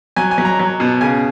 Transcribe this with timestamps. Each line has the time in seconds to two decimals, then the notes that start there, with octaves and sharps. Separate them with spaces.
0.16 F#3 G#5
0.31 G#5
0.38 F#3
0.45 A#5
0.59 F#3
0.80 B2
1.01 C#3 G#5